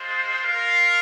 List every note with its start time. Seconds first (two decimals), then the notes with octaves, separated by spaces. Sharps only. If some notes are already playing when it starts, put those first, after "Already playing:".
Already playing: G#3 F4 C5
0.41 F4 A#4 F5